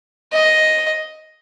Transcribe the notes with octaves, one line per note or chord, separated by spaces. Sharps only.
D#5